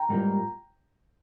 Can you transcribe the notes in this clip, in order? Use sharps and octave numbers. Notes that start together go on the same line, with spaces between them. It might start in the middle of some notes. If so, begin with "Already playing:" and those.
Already playing: G5 A#5
G#2 G3 A#3 F4